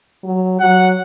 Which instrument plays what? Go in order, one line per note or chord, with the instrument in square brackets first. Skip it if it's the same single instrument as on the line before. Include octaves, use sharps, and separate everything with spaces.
[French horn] F#3
[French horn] F#3 [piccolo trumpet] F#5